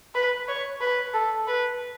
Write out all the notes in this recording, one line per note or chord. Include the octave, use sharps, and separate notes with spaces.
B4
C#5
B4
A4
B4